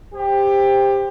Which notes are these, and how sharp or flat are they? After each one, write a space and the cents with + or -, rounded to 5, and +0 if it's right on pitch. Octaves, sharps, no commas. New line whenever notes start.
G4 +20 C5 +0